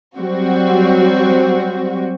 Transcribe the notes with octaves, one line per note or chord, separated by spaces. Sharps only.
F#3 G3 C4 F#4